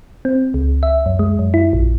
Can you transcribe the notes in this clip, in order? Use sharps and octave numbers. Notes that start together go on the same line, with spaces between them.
C4
C#2
E5
F#2
G#3
F#2
E4
A#1